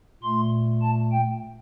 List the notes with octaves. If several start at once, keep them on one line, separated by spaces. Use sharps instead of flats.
A#2 A3 C6
A5
G5